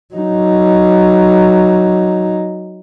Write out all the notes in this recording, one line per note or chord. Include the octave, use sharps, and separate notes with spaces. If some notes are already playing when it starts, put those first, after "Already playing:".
F#3 D#4